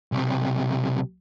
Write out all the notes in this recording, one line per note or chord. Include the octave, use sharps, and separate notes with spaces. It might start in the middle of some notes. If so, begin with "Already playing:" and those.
B1 C3